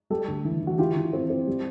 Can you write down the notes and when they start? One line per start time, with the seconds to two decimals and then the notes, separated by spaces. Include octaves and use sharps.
0.10 G3 G4 A4
0.28 D2
0.45 E3
0.62 E3
0.67 F#4
0.78 E3 F4 G4
0.96 E3
1.13 C4
1.30 C4
1.47 G3